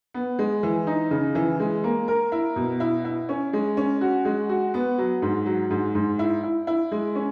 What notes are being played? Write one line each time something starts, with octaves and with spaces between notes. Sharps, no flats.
B3
G#3
E3
D#4
C#3
E3
G#3
A#3
A#4
E4
B2
E4
E4
C#4
G#3
C#4
F#4
G#3
F#4
B3
F#3
G#2
F#3
G#2
G#2
E4
E4
E4
G#3
C#4